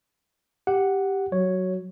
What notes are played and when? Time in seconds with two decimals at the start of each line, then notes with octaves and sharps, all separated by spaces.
0.67 G4 F#5
1.32 F#3 C#5